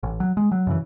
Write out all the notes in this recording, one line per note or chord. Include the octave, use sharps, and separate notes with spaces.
A1
F#3
G#3
F#3
F#2 C#3 E3